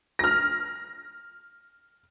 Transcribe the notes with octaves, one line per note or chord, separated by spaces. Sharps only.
F6 A#6